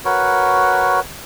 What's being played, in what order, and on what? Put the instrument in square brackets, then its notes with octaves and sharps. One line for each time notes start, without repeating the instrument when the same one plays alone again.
[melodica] F#4 A#4 B4 C#5